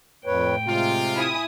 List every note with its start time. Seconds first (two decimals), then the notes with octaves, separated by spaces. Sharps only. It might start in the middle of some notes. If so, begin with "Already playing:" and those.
0.26 F2 A2 B4 C#5 G5
0.67 C3 G#3 F4
1.15 E4 G#5 D#6